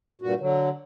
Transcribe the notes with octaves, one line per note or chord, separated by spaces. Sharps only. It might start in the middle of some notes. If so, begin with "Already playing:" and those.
G2 A#2 F#4
D3 F#3